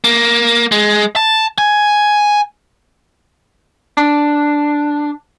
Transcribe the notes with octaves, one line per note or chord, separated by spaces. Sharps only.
A#3
G#3
A5
G#5
D4